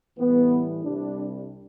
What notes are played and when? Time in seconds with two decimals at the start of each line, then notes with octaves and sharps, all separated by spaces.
0.18 A2 E3 G3 B3
0.84 C2 C3 G3 D4